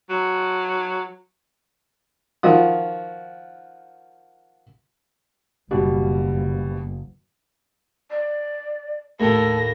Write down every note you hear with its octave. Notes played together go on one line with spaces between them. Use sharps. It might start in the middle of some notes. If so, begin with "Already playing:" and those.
F#3
D#3 F3 F#4 D#6
F#1 B2 G3
D5
D#2 A2 A3 A4 A#6